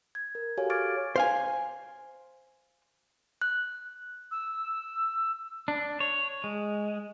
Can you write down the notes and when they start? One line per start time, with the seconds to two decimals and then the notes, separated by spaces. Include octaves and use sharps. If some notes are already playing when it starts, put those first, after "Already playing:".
0.15 G#6
0.35 A#4
0.57 F#4 G4 A4 C#5 F5 G#5
0.70 C#6 D6 F6 G#6 A6 D7
1.16 C5 F5 G#5
3.42 F#6
4.31 E6
5.68 D4
6.00 C#5
6.44 G#3